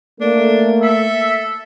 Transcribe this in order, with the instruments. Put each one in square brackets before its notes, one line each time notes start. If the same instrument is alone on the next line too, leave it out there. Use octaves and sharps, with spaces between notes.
[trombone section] A3 [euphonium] A#3 [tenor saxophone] D4
[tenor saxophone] A4 [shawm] E5